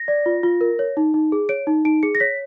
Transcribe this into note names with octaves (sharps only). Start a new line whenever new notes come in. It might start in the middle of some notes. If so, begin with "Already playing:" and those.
Already playing: A#6
D5
F4
F4
A#4
C#5
D#4
D#4
G#4
C#5 D7
D#4
D#4 D7
G#4 C#7
A#6
C#5 B6